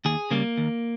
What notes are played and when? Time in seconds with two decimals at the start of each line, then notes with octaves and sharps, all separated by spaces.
0.05 D#2 G#4
0.31 C#3 G3 A#3
0.58 D#2